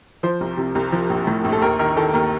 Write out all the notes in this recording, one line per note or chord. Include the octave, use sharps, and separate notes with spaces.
F3 C5
C2
C3
C2
F3
A#1
A2
A#1
A4
D#2 A#4
D#3 A#4
D#3 A4
D#2 A#4